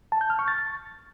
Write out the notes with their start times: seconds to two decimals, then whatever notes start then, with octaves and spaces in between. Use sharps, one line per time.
0.12 A5
0.21 G6
0.30 F6
0.39 C#6
0.48 A6